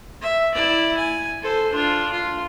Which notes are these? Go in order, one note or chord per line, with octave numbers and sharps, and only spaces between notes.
E5
E4 D5
G#5
A4 C5
D4 F4
F4